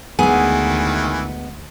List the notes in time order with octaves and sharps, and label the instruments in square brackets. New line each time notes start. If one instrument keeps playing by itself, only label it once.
[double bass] D2 [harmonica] D#3 E3 [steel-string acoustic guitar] G#3 B3 [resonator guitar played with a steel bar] G#4